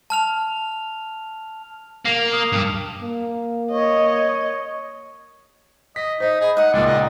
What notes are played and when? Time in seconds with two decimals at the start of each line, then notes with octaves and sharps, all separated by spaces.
0.10 A5 F6 F7
2.05 A#3 C7 F7
2.33 D#6
2.52 G2
3.02 A#3
3.71 C#5 D#5
5.96 D#5 B6
6.20 D#4 C5 D#5
6.41 G#4 D#5 B5
6.57 D#4 F#5 D#6
6.73 C#2 A#2 D4
6.86 D5 D#5 F#5